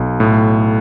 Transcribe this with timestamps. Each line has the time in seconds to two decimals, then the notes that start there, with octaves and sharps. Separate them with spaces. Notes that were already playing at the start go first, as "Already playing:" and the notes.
Already playing: B1
0.20 A2